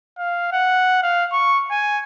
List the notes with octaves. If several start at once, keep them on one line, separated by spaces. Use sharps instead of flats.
F5
F#5
F5
C#6
G#5